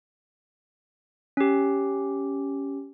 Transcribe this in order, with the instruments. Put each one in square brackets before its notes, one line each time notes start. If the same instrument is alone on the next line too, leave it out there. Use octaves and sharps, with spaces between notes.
[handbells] C#4 G4